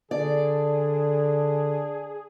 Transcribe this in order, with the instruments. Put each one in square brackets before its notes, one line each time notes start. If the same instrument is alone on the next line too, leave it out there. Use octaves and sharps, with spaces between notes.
[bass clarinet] D3 [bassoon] D4 [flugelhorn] G#4 [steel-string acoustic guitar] D5